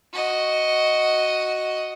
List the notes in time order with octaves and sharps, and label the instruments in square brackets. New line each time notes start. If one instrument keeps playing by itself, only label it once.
[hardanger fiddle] F#4 D#5